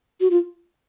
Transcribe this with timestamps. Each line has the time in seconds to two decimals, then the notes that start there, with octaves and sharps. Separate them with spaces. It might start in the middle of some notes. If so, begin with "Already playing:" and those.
0.21 F#4
0.31 F4